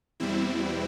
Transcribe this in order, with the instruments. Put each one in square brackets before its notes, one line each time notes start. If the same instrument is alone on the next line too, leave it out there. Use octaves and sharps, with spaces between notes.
[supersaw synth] E2 B2 G3 C4 E4